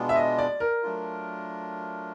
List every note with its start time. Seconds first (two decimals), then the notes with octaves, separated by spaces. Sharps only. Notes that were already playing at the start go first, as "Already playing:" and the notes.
Already playing: B2 G#3 B3 D4 F4
0.09 E5
0.16 D#5
0.38 D5
0.60 A#4
0.83 F#3 A3 D4 F4